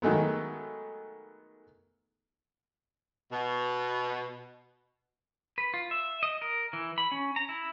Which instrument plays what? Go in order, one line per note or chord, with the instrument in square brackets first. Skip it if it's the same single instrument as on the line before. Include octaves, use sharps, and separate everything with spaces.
[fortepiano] D#3 F#3 G#3 A3 B3
[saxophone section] B2
[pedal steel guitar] B4
F4
E5
D#5
A#4
E3
B5
C#4
A#5
E4